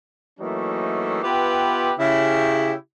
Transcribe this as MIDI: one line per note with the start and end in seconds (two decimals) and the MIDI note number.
0.40 1.20 52
0.40 1.20 54
0.40 1.20 57
0.40 1.20 58
0.40 1.20 61
0.40 1.20 63
1.22 1.92 59
1.22 1.92 65
1.22 1.92 67
1.22 1.92 71
1.22 1.92 76
1.22 1.92 79
1.99 2.73 49
1.99 2.73 64
1.99 2.73 67